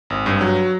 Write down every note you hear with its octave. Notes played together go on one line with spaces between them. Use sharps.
G#1
G2
F#3